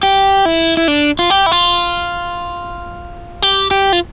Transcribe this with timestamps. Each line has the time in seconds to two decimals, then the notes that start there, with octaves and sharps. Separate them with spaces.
0.03 G4
0.45 E4
0.77 E4
0.88 D4
1.19 F4
1.30 G4
1.46 E4
1.51 F4
3.42 G4
3.71 G4
3.93 F4